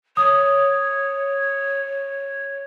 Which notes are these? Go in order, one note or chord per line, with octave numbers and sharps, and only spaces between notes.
C#5 D#6